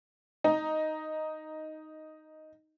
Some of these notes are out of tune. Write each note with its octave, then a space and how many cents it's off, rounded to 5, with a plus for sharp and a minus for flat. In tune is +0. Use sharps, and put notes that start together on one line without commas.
D#4 +0 A#5 +0